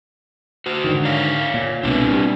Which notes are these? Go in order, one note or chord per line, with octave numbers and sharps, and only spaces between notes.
F#4 C5
G#2 D3 D#3
C#5 D5 F5
A#2
C2 B2 A3 C4 D4 B4
A#2 G3